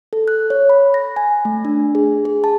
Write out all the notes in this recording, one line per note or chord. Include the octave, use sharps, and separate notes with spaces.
A4
F#6
C#5
B5
A#6
G#5
A3
D4
G#4
G#4
A5